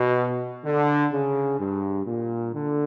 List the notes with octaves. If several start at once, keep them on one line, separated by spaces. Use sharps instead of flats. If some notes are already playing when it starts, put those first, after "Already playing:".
Already playing: B2
D3
C#3
G2
A#2
D3